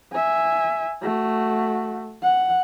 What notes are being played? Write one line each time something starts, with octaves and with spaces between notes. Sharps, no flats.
E5 G#5
A3 F#4
F#5